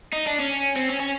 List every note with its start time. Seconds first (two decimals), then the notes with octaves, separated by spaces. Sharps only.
0.13 D#4
0.27 D4
0.40 C#4
0.76 C4
0.89 C#4
1.00 C#4